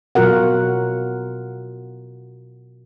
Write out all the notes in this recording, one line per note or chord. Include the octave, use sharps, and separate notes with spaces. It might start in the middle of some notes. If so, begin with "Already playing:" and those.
B2 F#3 F4 F#4 A#4 F#5